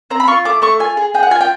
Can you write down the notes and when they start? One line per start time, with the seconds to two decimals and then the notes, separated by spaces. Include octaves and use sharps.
0.10 C4 A#5
0.20 B5
0.27 F4 C#6
0.45 A3 D6
0.62 A3 C#6
0.80 F4 G#5
0.97 G#4
1.14 G#4 G5
1.23 F#5
1.31 F4 G#5
1.41 G5